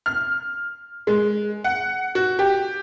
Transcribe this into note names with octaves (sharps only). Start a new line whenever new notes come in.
F6
G#3
F#5
F#4
G4